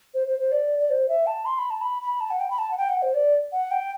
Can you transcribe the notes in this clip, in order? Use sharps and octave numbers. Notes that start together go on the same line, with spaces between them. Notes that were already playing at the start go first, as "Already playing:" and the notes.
C5
C5
C5
D5
D5
C5
E5
A5
C6
B5
A5
B5
B5
A5
F#5
G5
B5
A5
F#5
G5
F#5
C5
D5
F#5
G5